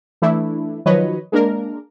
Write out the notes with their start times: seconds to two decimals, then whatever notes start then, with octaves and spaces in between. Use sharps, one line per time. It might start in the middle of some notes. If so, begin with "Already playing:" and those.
0.22 E3 A3 D4 E4
0.86 D#3 F3 F#3 B4 C#5 D#5
1.32 G#3 A#3 D4 A#4